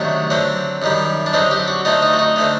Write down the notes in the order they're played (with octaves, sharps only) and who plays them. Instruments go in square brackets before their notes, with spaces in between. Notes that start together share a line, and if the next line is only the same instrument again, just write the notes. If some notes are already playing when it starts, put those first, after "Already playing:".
Already playing: [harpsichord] C3 D#3 F#3 A3 D4 F#4
D3 F#3 C4
F#2 D#3 G3
D4
D3 F#3 C4 D#4
G4
F#4
D3 A3 C4 D#4
D#4
F#4
D#4
D3 A3 C4